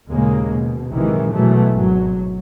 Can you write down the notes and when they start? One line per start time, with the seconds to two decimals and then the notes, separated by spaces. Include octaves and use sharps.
0.10 D#2 A#2 C#3 G#3 A#3
0.52 B2
0.91 A#1 F#2 C3 D#3 E3 G#3
1.33 B2 E3 F#3 G#3 A3
1.72 G#1 F#3